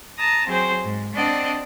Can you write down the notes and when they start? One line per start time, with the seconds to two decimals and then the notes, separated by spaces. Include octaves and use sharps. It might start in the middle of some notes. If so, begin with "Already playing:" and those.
0.18 A5 A#5 D#6
0.47 F#3 C4 G#4 C5
0.84 G#2
1.14 C4 D4 D5 D#5 F#5